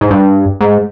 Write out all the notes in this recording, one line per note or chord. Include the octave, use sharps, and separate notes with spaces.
G#2
G2
G#2